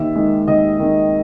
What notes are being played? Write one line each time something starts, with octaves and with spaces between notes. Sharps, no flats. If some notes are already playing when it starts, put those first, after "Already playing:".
Already playing: D#2 E5
D#3 G#3
D#2 D#5
D#3 G#3